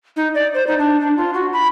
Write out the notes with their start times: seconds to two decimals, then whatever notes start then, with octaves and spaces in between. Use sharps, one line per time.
0.16 D#4
0.35 D5
0.54 C5
0.67 D#4
0.78 D4
1.01 D4
1.17 F4
1.34 F#4
1.53 B5